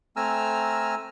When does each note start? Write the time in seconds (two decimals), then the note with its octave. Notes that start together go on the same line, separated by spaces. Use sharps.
0.16 A3 C4 G#5 A#5 E6 F6